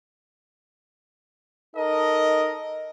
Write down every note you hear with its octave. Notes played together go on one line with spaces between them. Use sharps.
D#4 A4 A#4 D#5